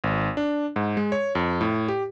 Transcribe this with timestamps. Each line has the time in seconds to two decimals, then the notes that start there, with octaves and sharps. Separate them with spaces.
0.04 G#1
0.37 D4
0.76 G#2
0.97 G#3
1.12 C#5
1.35 F2
1.61 A2
1.88 G4